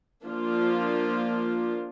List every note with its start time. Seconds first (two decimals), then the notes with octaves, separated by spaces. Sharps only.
0.24 F3 A#3 D4 F4